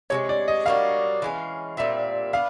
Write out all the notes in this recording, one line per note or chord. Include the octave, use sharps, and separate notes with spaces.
C3 E3 G#3 C#5
D5
D#5
G3 A#3 D4 F#4 F5
E3 G#3 C#4
A#2 G3 C4 E5
B3 D4 F5